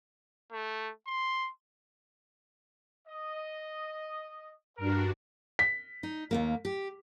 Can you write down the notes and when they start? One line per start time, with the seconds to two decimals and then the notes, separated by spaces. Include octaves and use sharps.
0.52 A3
1.07 C6
3.08 D#5
4.78 G2 D4 F#4 A#4
5.59 B6
6.03 D#4
6.31 D#2 G#2 A#3
6.65 G4